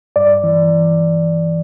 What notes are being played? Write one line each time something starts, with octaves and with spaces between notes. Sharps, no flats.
G2 D5
E3